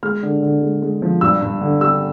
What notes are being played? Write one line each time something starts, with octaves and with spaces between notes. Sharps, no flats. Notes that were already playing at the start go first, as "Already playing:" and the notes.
G#3 F6
D3
D3
G#3
G#3
F3
G2 E6
G2
D3
G3 E6